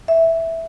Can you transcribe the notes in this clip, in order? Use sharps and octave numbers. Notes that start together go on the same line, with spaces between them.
E5